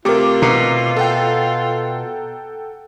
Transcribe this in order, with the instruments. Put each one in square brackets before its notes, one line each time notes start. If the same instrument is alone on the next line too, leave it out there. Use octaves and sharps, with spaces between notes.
[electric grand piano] C3 A3 D6 [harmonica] F4 [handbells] G4 A#4
[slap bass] B2 [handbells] A#5
[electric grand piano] A4 F#5 G5